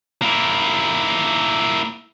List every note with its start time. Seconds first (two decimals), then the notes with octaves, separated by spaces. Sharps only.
0.22 A#3 E4